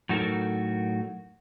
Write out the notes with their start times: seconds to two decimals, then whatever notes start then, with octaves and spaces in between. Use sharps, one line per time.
0.09 A2 F#3 D#4 F#4 A4 A#4